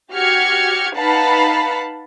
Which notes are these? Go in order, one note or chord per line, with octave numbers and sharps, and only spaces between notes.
F#4 G4 F6 G#6 C#7
D#4 B4 F5 F#5 A5 B5